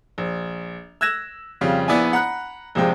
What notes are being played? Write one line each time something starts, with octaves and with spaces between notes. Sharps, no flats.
A#1
E6 F#6 G#6 A#6 E7
F2 C#3 G3 F4
A#1 B3 E4 D5 G#5
F#5 A#5 B5 F#6
A#1 C3 F3 G#3 G5